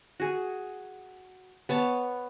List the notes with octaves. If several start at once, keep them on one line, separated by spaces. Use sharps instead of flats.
F#4 G#4
B3 C#5 A5